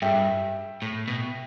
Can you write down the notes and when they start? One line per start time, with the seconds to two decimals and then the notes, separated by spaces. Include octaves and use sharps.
0.02 G2 E5 G5
0.82 A2
1.08 B2